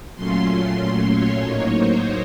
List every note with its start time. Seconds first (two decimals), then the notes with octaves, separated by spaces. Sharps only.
0.15 A#2 F#3 A3 C#4 F4 C6
0.47 C6
0.78 A#2 F#3 A3 C#4
1.10 C#5
1.43 A2 F#3 A#3 D#4
1.73 C5